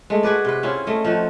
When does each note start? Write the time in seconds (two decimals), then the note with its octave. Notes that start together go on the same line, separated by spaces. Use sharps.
0.10 G#3 A3
0.23 F#4 G#4 B4 D5
0.45 C3 B4
0.63 C4 C#4 E4 F4
0.87 A3 D#5
1.05 F3 D#4 F#4